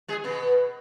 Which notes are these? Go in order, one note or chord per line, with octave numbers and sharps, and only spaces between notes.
G#3 G#4
B2 B3